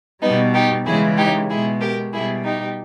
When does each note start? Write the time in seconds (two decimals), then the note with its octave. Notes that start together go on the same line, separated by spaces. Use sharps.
0.22 B2 G3 B3 D#4
0.54 D#4 G4
0.85 C#3 E3 G#3 E4 G#4
1.17 D#4 G4
1.49 B2 G#3 E4 G#4
1.81 G4 A#4
2.13 B2 G3 E4 G#4
2.44 D#4 G4